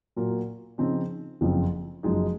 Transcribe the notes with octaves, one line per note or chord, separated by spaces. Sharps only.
A#2 F#3 A#3 F4 A#4
C#3 F3 C4 D#4
F#1 F2 C#3 F3 C4
F#1 F#2 F3 G#3 D#4